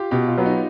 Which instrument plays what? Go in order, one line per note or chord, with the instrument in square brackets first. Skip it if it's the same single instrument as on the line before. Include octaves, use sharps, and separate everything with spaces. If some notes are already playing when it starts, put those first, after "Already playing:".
Already playing: [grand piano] F4 G4
[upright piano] B2 [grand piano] G4
[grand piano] F4
[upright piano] F#3 B3
[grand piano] D#4